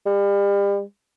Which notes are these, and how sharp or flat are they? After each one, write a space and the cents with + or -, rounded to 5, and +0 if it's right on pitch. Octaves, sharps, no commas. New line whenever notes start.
G3 +35